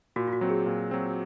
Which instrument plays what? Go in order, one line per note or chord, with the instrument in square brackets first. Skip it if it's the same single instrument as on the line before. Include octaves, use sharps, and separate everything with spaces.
[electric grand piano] A#2 [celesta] F#4
[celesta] F4
F#4
[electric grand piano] F#3 C4
[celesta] G#4
[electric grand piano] A#2
F#3 C4